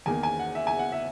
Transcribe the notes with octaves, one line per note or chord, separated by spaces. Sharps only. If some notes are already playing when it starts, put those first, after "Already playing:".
E2 D#3 A#3 G#5
G#5
F#5
E5
G#5
F#5
E5